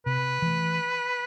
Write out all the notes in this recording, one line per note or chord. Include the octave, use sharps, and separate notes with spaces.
C3 B4
E3 A3